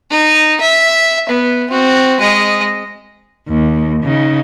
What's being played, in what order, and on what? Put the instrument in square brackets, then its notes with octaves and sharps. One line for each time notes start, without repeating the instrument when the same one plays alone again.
[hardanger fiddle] D#4
E5
B3
C4 F#4
G#3 D#5
[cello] D#2
C#3 D#4